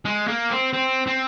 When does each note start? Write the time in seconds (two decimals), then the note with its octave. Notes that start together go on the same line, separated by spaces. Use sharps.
0.05 G#3
0.28 A#3
0.50 C4
0.73 C4
1.07 C4